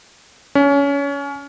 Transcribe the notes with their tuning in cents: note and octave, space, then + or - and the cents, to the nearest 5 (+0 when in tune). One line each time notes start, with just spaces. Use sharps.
C#4 +25